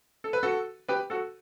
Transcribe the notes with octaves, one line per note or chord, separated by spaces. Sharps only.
A4
B4
F#4 A4
G4 B4
F#4 A4